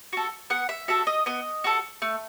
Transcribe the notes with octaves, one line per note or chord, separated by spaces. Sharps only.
F#4 A4
B3 F#5
E5
F#4 A4 E5
D#5
B3 D#5
F#4 A4
A3